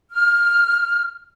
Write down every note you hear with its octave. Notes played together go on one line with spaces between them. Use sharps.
F6